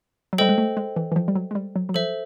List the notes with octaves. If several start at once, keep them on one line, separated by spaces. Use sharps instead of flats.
F#3
G3 A4 C5 D#5 G5
G#3
A3
G#3
E3
E3
F3
G3
F#3
G#3
G3
F#3
F#3
F3 A4 C5 E5